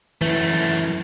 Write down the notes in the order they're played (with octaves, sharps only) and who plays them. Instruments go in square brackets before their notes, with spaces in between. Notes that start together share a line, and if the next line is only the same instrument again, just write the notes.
[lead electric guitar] F#2 A3 [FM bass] E3